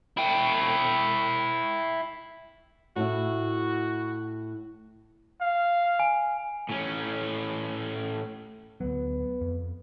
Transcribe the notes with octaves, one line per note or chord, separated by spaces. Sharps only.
E4 G5
A2 E4 F#4
F5
G#5
A2 C#4
D2 F#3 B3
F2